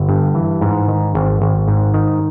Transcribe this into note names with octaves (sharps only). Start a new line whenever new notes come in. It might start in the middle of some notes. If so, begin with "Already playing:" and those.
Already playing: G1
G2
E3
G#2
D#3
G#1
G#1
G#2
D#3